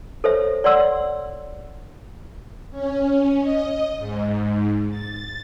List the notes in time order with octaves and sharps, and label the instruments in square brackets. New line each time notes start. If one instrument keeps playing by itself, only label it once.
[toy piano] A4 C5 C#5 E5
C#5 D5 F#5 C6 E6
[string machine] C#4
D#5
G#2
A6